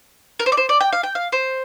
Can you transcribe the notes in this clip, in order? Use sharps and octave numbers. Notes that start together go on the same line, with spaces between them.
A#4
C5
D5
C5
D5
G5
F5
G5
F5
C5